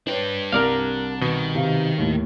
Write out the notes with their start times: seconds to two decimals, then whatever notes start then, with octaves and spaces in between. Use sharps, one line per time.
0.07 D4 B4 C#5 G5
0.52 C2 A#4 D5 F5
1.22 B2 D#3
1.55 C3 F5
1.98 D#2 A2